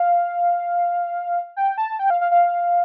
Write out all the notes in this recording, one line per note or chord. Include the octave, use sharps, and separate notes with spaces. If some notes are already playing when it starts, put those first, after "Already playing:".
Already playing: F5
G5
A5
G5
F5
F5
F5